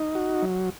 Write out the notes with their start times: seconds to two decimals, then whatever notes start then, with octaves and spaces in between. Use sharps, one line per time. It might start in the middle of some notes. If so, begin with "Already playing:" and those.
Already playing: D#4
0.15 F#4
0.42 F#3